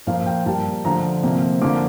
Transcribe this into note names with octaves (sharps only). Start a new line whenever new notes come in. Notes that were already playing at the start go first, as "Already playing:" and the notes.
A#2 F3 A#3 F5
G5
A#2 G3 A#3 A5
D3 F3 A3 A#5
C3 F3 A#3
D3 F3 A#3 D6